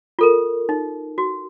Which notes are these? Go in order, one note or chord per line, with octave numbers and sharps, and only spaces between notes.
F4 A4 A#4
D#4
F#4